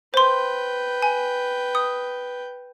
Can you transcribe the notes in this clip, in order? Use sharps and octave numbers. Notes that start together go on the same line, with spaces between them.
B4 C5 G5 C6
G#5
D#6